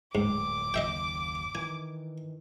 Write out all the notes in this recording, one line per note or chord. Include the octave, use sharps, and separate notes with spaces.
D1 F2 G#2 D6
F#1 D#2 D#5 E5 G5
D#3 E3 G#5